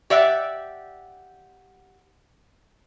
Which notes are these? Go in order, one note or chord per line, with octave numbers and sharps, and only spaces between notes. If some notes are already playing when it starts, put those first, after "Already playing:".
G4 D5 E5 F#5